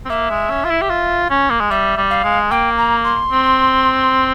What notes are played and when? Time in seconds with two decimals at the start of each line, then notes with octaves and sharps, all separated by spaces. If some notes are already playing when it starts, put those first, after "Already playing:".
0.05 C4
0.09 A#3 E5
0.30 G#3
0.50 C#4
0.64 F4
0.70 E4
0.81 G4
0.90 F4
1.30 C#4
1.50 A#3
1.60 G#3
1.71 G3 E5
1.97 G3
2.10 F5
2.24 G#3
2.51 A#3 G5
2.78 A#5
3.04 C6
3.32 C4